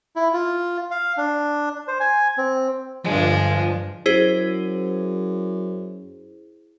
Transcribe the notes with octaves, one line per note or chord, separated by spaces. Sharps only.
E4
F4
F5
D4
C5
G#5
C4
G2 D3 F3 G#3 D4
F#2 E4 G#4 C5